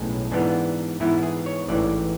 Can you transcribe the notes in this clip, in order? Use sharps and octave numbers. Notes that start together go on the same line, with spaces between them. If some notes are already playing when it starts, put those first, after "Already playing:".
Already playing: B1 A2 G#3 C#4
G#2 E3 B3 D4
G#2 E3 B3 E4
G#4
C#5
A1 G#2 E3 D5